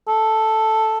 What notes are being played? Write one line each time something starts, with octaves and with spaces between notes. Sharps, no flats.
A4